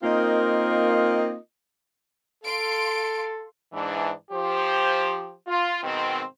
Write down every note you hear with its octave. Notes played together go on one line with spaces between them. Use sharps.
A#3 C4 D#4 F4 A#4 D#5
A4 F5 C6 D7
G#2 E3 D4
F3 G4 C5
F4
G#2 B2 D#3 C4